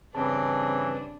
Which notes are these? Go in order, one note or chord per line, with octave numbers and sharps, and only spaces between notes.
G2 C#3 E3 C4 D4 A5